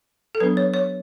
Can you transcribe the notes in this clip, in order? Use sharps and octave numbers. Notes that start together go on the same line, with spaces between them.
A4
F#3 B3 D4 B4
C#5
C#5